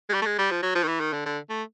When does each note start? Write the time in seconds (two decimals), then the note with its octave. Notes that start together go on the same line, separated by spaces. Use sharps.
0.10 G#3
0.14 G3
0.22 A3
0.26 G#3
0.38 G3
0.51 F3
0.63 F#3
0.75 F3
0.83 D#3
0.88 E3
1.00 D#3
1.13 D3
1.26 D3
1.50 A3